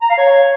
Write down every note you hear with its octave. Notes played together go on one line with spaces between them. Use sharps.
A#5
F5
C#5